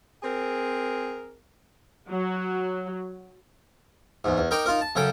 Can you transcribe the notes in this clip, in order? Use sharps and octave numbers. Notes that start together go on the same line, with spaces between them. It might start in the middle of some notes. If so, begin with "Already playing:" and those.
C4 G#4 A#4
F#3
E2 G#2
E2
D#4 A#4 G5 A#5 D6
D#4 F4 A#4
A5
F#2 C#3 A4 G5